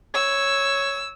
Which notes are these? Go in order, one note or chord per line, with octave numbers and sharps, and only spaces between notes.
C#5 E6